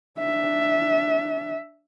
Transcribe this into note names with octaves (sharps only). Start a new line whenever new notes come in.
D4 E5